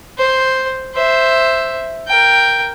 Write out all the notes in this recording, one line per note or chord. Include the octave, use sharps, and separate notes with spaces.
C5
C5 E5
A#4 G5